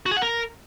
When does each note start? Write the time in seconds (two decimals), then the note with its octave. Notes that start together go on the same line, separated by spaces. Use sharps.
0.06 F#4
0.11 G#4
0.17 F#5
0.22 A#4